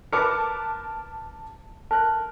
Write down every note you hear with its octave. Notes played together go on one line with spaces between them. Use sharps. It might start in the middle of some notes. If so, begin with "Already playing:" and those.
A#4 B4 A5 A#5 D6 C#7
A#4 A5 F#6